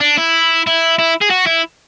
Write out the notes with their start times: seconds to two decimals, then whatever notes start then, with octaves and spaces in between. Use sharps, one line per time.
0.01 D4
0.18 E4
0.67 E4
0.99 E4
1.21 G#4
1.30 F#4
1.47 E4